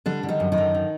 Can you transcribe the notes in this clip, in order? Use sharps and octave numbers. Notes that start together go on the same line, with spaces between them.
D3 G3 D4
D3
D#3 D#4
F#2
D#3 D#4
D3
D3